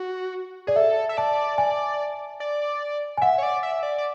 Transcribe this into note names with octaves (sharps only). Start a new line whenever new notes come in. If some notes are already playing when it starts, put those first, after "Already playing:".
Already playing: F#4
G#4 D5
A4 E5
E5
D5 A5
G#5
D5
G#5
E5 F#5
C#5
D5
E5
D5
D5